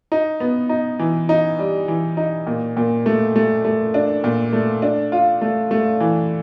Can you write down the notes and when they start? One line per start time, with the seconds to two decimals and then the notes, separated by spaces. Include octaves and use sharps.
0.12 D#4
0.40 B3
0.69 D#4
0.99 E3
1.29 D#4
1.59 G3
1.88 E3
2.17 D#4
2.47 A#2
2.77 A#2
3.06 A3
3.36 A3
3.65 A3
3.94 D4
4.24 A#2
4.53 A3
4.82 D4
5.12 F4
5.41 A3
5.71 A3
6.00 E3